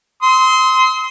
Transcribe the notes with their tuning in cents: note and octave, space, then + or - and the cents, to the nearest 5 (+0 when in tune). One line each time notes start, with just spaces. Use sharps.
C6 -10 D#6 +45